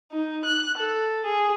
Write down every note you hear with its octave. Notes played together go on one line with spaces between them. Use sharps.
D#4
F#6
A4
G#4